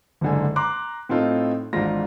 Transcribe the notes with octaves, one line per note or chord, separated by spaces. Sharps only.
F#1 G#2 D3 G#5
A#5 C6 D6 F#6
A2 C4 D#4 F4 A4
G#1 E2 G#2 D4 F4 A#6